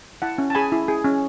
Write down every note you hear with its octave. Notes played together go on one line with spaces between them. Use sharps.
E4 F#5 A5
C#4
A5
G#4 G#5 B5
E4
G#4
C#4